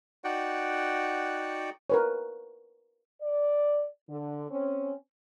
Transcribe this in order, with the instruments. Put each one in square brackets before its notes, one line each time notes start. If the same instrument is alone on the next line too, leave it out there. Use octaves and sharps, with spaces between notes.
[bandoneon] D#4 F#4 D5 F#5 G5
[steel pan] A#4 B4 C#5
[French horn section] D5
D3
C4 C#4